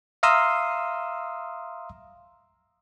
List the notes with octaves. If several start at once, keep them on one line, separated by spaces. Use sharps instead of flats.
E5 F5 A#5 C6 D#6 E6